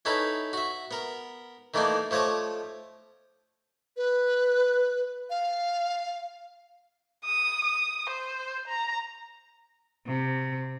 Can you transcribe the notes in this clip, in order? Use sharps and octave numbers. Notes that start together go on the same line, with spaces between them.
C#4 D#4 E4 A4 B4
F#4 E5
B3 A#4
D#3 E3 A3 A#3 D4 D#4
F3 A3 C#5 D#5 D6
B4
F5
D#6
D#6
C5
A#5
C3